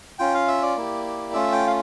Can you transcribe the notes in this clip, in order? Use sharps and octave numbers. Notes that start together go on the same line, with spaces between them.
C#4 F4 G5
F5
E5
D5
A#3 E4 G4
A3 C#4 F4 E5
G5
F5